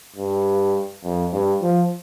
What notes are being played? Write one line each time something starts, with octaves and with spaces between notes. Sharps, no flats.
G2
F2
G2
F3